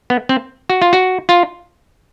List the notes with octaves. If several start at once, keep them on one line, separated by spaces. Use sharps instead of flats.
B3
C4
F#4
F4
F#4
F4